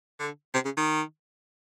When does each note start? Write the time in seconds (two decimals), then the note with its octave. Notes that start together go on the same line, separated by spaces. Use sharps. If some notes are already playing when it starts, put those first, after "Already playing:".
0.19 D3
0.54 C3
0.65 C#3
0.77 D#3